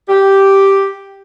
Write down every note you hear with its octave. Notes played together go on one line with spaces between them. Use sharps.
G4